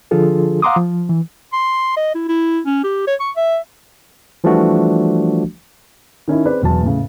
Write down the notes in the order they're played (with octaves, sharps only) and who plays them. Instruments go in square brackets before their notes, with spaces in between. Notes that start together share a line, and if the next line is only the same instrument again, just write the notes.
[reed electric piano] D3 F3 D4 F4 G#4 A4
F5 F#5 A#5 C6 D6 D#6
F3
E3
[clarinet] C6
D#5
E4
E4
C#4
G4
C#5
C#6
E5
[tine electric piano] E3 F3 G3 A3 D4 F#4
[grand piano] D#3 C#4 D#4 E4
C4 G#4 B4 D5
E1 E2 F#3 A5
A2 C#3